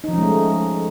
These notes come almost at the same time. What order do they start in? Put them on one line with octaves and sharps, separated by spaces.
D#4 F3 C#4 G#3 A3